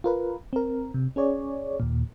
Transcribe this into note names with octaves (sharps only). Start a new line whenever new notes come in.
F4 A#4 B4
C4 A#4
C3
C#4 G#4 C#5 D5
D#2 A#2